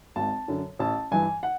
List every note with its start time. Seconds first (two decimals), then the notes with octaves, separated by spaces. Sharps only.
0.16 G#1 A5
0.48 F#2 D3
0.79 A1 A5
1.11 G2 E3 G#5
1.43 F#5